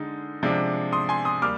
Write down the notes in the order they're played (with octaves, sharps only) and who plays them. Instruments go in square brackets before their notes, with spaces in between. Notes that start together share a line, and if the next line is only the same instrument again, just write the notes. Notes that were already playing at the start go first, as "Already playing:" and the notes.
Already playing: [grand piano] D3 G#3 D#4
C3 F3 G#3 D4
C6 D#6
G#5 C6
C6 D#6
G3 A#3 D6 F6